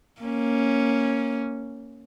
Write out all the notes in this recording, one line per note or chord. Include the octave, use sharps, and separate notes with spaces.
A#3 C#4